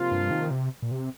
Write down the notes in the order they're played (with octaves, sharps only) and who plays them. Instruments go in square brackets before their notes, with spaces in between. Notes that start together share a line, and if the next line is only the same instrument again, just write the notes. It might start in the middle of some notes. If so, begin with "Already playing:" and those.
Already playing: [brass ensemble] C3 F3 A#3 F4
[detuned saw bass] G2
D#3
C3
A#2
C3